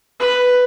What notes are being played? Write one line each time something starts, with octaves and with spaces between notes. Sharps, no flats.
B4